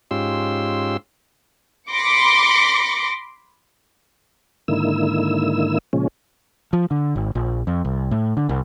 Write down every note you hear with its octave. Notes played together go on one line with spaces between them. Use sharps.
G#2 C#4 F4 G4 C6 E6
B5 C6 D6 A#6 C#7
G#2 D3 D#3 A#3 E4 E6
A#2 C#3 F3 G#3 C#4
F3
D3
G#1
A#1
F2
C2
A2
D3
C2